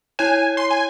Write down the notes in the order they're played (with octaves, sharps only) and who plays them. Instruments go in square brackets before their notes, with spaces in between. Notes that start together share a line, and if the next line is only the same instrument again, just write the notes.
[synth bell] E4 C#5 [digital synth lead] G#5
[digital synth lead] C6
G#5